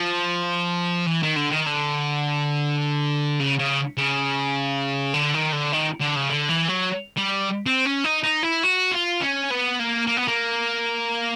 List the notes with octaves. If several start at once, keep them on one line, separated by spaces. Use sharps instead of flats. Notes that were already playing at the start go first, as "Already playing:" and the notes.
Already playing: F3
E3
D#3
D3
D#3
D3
C#3
C#3
C#3
D3
D#3
D3
D#3
D3
C#3
D3
E3
F#3
G3
C4
C#4
D#4
D#4
E4
F#4
F4
C#4
B3
A#3
A#3
B3
A#3